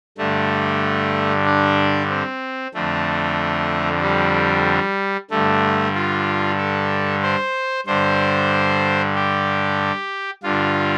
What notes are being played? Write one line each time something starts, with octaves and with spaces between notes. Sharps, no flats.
G2 D3 A3
D4
C4
F2 D3 A3
G3
G2 D3 A3
F4
A4
C5
G2 D3 C5
G4
G2 D3 F4